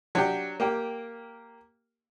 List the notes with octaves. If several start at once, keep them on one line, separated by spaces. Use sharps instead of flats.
F#3 D4 G4
A#3 G4 G5